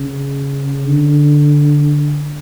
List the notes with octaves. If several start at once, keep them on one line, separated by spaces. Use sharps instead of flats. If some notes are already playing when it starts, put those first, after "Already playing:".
Already playing: C#3
D3